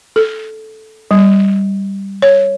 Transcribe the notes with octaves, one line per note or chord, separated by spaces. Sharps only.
A4
G3
C#5